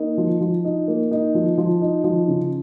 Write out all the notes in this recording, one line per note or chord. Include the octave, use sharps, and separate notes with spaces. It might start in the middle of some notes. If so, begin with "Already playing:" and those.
Already playing: A#3 D#4
F3
F3
D#4
A#3
D#4
F3
F3
D#4
F3
C#3